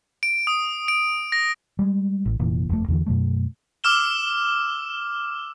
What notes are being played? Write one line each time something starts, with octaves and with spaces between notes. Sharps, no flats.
D7
D#6
D7
A#6
G3 G#3
A1
F1 A#2 E3
F#1 F2 C#3 A3
E2 D3 E3
F#2 B2 F#3 A3
D6 E6 F6 E7 G7